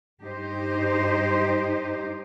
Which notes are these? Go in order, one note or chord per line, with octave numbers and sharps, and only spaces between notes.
G2 D#4 G4 C5 D#5